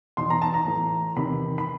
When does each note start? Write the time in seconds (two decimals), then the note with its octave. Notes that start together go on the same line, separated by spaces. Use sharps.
0.17 E2 B2 C6
0.30 A#5
0.42 A5
0.54 A#5
0.67 A2 E3
1.16 E2 C3 D#3 B5
1.58 B5